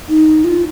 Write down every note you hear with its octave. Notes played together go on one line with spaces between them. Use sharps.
D#4
F4